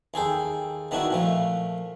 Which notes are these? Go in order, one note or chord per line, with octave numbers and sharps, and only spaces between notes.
D#2 G#4 A4 G5
D#3 B3 D4 E4 F#4
A#2 F3 A3